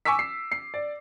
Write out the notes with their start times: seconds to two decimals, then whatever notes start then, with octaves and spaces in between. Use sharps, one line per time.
0.05 G#5 C#6 D6 E6 B6
0.19 C7
0.52 C7
0.74 D5